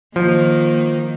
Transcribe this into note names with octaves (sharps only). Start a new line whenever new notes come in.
D#3 F3 A#3